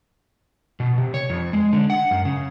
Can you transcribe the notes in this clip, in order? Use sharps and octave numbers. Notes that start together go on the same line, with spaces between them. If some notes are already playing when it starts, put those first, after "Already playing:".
B2
C3
C#5
F2
G#3
D3
F#5
F#2
C#3